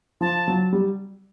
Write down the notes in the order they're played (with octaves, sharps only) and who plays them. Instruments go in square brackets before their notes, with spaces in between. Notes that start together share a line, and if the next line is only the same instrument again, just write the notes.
[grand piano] F3 [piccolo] A5
[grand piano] F#3
G3